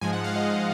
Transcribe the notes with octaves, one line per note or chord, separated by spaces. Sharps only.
G#2 F3 G#3 G#5
F#5
F5
D#5